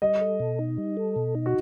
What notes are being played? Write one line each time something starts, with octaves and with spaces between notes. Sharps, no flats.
G3 D#5
A4
B2
D#4
G3
A4
B2
D#4
F#4